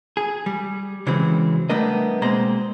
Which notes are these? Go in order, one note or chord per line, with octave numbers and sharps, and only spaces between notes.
G#4
G3
C#3 E3 F#3 G#3 C4
G3 A3 B3 D4 A#4 D#5
B2 G#3 A#3 C4 C5 A#5